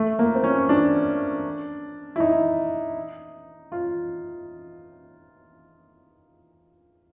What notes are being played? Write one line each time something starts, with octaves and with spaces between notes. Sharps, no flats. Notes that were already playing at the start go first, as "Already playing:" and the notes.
Already playing: A3
A#3
C4
C#4
D4
E4
D#4
F4